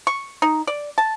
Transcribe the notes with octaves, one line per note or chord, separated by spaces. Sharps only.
C#6
D#4
D5
A5